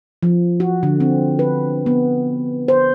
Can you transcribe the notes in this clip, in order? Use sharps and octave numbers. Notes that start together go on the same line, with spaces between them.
F3
F#4
D3
C4
B4
B3
C5